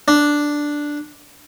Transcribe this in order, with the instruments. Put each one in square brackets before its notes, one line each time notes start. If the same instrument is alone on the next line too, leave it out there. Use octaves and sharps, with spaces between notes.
[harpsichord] D4